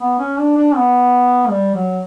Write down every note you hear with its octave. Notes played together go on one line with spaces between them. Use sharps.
B3
C#4
D4
D4
B3
G3
F#3